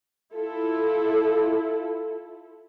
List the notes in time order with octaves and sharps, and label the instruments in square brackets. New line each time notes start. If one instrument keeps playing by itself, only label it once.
[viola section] E4 F4 A4